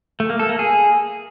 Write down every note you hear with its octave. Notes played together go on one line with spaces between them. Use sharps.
A3
A#3
A4
A#3
G#4